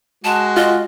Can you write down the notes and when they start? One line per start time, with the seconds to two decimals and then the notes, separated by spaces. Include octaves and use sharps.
0.24 G#3 F#4 A5
0.57 F4 D#5